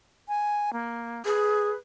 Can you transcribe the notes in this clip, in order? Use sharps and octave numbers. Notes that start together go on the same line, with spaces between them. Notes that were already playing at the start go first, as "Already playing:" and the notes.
G#5
A#3
G#4 B4